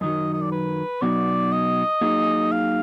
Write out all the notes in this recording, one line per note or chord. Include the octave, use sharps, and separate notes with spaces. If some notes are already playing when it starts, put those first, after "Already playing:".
F#2 D#3 F#3 D#5
D#5
D5
B4
B2 F#3 B3 D#4 F#4 D5
D#5
F#3 A#3 D#4 G#4
F5